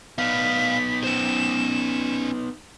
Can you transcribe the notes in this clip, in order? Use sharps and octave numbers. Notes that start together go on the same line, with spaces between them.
B3 D#4 D5 F5 B6
C#4 C5 E7